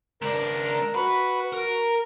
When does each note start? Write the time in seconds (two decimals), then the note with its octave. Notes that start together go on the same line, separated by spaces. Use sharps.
0.22 C#2 D4 A#4
0.95 F#4 B4
1.53 A#4